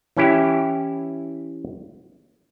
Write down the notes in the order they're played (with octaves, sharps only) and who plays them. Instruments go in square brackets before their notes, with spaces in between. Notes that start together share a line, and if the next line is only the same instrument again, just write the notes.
[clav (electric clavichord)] E3 C#4 E4 G4